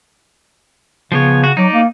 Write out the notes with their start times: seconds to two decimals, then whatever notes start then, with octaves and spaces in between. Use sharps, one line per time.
1.12 C#3 F3 B3 C#5
1.44 F#4
1.57 F#3 D#4 D5
1.73 A#3